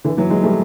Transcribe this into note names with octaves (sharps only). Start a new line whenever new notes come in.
D3 E3
E3 F#3
F#3 G#3
G3 A3